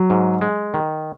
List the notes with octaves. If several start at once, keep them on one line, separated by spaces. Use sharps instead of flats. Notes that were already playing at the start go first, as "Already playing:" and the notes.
Already playing: F#3
G#2
G#3
D#3